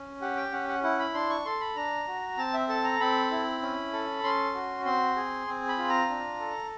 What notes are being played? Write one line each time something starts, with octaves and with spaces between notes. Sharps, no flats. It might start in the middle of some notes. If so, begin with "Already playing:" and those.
Already playing: C#4
G4 F#5
G5
C#4 F#5
F#5
E4 F#5
B5
D4 C6
C#6
A4 C6
B5
D4 A#5
F#4
C4 A5
E5
A4 A5
A#5
C4 B5
E4
C#4
A4
C#4 C6
F#4
C4 C6
G#4
C4
B5
F4
A#5
D4
A4